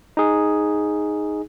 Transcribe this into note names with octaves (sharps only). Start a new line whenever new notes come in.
D#4 G#4